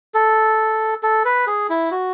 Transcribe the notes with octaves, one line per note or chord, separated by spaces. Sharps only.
A4
A4
B4
G#4
E4
F#4